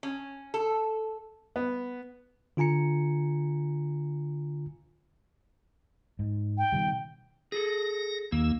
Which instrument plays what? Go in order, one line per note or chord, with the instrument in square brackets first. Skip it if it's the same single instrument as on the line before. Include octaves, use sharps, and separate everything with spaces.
[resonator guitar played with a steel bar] C#4
A4
[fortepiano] B3
[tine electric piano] D3 F4 G#5 A#5 C#7
[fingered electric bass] G#2
[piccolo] G5
[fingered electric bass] B2 D#3 G3
[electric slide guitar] G#4 A4 [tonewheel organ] A#6
[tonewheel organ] D#2 E6 [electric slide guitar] A#3